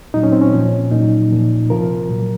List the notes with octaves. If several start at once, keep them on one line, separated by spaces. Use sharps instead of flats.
A#2 F#3 D#4
C#4
C4
C#4
A#2 F3
A#2 F#3 D#4
A#2 F3
C3 F3 A#4
A#2 F#3